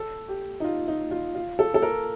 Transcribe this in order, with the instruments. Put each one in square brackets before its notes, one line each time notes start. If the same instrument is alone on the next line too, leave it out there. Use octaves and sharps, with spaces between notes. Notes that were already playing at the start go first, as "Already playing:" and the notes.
Already playing: [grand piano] A4
G4
D#4
F4
D#4
F4
F4
A4
A4
A#4